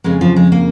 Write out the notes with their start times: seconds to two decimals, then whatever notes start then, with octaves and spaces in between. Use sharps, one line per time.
0.04 F2 C#3 G#3
0.21 F3
0.36 G#3
0.52 A#3